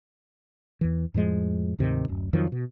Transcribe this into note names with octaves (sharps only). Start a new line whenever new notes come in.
E2 E3
F2 A2 F3 G#3
D2 G#2 C3 D#3
D1 F#2
F2 D#3 F3 F#3
B2